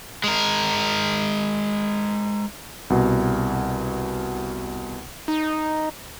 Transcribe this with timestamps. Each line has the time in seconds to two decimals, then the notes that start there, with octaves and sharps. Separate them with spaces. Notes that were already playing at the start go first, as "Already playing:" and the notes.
0.24 G#3 A#4
2.90 C2 B2
5.28 D#4